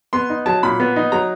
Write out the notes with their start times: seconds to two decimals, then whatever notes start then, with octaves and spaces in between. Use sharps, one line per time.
0.13 B3 C6
0.30 D#4
0.46 F#3 A5
0.63 A#2 B5
0.80 B3
0.96 D#4
1.12 F#3 A#5